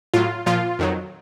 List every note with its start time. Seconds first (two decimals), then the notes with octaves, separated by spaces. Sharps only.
0.14 A2 F#3 F4
0.46 A#2 F3 F4
0.79 F2 D#3 F#3